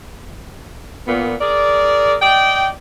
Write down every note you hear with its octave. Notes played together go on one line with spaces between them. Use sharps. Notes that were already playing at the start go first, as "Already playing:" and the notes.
A#2 B3
G#4 A#4 D5
D5 D#5 G5